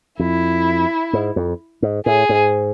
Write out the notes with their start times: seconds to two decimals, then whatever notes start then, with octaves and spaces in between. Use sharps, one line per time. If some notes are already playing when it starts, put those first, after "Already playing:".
0.19 F2 E4
1.13 G#2
1.36 F2
1.82 G#2
2.06 A2 G#4
2.29 G#2